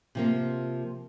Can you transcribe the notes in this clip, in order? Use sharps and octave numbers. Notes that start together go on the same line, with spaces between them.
C3 F3 A#3